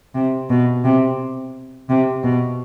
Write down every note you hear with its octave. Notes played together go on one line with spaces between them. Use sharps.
C3
B2
C3
C3
B2